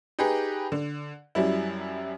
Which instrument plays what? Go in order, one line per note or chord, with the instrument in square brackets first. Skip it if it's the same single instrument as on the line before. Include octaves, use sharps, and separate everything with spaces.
[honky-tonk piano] D#4 G4 G#4 B4
D3
F#2 F#3 G3 E4